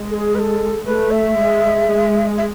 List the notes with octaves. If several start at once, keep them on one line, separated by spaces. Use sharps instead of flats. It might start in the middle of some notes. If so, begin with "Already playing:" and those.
Already playing: G#3
A4
G#4
B4
A4
A3 B4
E5
G#3
G#3
E5